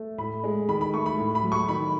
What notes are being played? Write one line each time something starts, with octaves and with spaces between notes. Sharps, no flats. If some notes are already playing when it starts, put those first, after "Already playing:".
Already playing: A3
A2 B5
G#3
D#3 B5
B5
A3 C#6
B5
A2
B5
F#3
C#6
D#3 B5